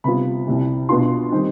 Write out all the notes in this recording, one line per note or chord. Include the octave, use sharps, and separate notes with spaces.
C3 G3 B3 F4 B5
C2 C3 G3
B2 B3 D4 F4 C6
D#3 G3 C4 D#4